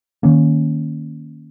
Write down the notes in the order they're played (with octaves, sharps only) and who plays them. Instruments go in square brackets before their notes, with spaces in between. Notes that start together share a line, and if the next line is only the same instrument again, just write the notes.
[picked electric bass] D#3 A#3 C#4